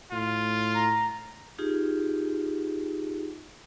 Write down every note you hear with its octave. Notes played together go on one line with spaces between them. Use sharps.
A2 F4
A#5
D#4 F4 G4 G#4